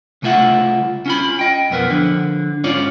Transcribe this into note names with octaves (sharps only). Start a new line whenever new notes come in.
C2 C#3 A3 F4 E5 F#5
C#4 F4 B5
D#5 G5
B1 F2 B3 A#4 B4
D3 F3
G#2 C#4 F4 C#5 D5